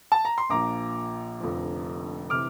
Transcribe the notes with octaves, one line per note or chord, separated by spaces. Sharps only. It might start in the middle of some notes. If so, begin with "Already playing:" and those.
A5
A#5
C6
A#1 A#2 F3 A#5 D6
F1 F2 D3 F3
C3 E3 D6 F6